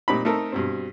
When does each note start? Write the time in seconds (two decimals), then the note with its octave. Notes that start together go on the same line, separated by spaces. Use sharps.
0.08 A#2 G3 C4 D#4 B5
0.25 A3 C4 D#4 A4 A#4
0.52 G2 B2 C4